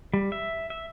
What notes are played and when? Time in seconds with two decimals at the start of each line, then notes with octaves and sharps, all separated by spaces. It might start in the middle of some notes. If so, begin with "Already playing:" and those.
0.14 G3
0.32 E5
0.70 E5